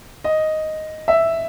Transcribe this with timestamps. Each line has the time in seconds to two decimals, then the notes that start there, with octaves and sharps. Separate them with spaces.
0.24 D#5
1.08 E5